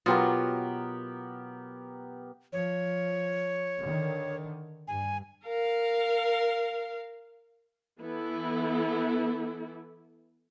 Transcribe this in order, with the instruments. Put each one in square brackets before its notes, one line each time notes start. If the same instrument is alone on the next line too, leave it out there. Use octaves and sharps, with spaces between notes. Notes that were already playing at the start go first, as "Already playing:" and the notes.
[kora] B2 F#3 F4 [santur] B3 G4 A#4
[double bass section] F3 [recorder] C#5
[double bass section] D3 D#3
[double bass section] G2 [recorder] G#5
[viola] A#4 F5
[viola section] E3 B3 E4 A4